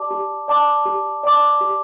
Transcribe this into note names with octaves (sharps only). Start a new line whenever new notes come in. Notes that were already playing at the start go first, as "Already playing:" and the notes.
Already playing: G4 D5 A5 D6
G4
D5 A5 D6
G4
D5 A5 D6
G4